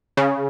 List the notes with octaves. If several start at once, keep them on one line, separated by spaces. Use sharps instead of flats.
C#3